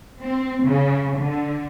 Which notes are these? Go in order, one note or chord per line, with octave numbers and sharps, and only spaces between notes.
C4
C#3
D3